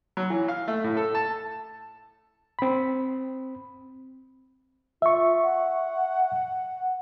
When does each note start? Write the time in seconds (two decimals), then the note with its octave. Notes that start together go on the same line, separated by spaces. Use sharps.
0.17 F#3
0.30 E3
0.48 F5
0.68 A3
0.84 A2
0.97 A4
1.15 A5
2.59 C4 B5
5.02 F4 E5 C#6
5.43 F#5